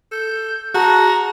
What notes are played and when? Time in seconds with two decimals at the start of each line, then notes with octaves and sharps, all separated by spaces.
0.11 A4 G6
0.74 F#4 G#4 A5 A#5